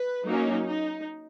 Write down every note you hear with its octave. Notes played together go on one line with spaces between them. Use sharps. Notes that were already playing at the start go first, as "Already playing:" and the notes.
Already playing: B4
F#3 A#3 C#4 D#4
D#4